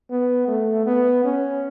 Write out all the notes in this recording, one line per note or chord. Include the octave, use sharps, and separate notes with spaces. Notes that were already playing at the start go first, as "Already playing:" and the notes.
B3
A3
B3
C#4